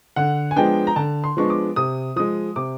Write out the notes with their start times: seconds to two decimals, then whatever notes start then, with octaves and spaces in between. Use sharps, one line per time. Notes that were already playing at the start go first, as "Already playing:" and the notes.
0.16 D3 F#5
0.51 G#5
0.56 F3 G#3 B3 D4 G5
0.87 A#5
0.96 D3 A5
1.24 C6
1.37 F3 G#3 B3 D4 C#6
1.50 D6
1.76 C3 D#6
2.16 F3 G#3 D#6
2.56 C3 D6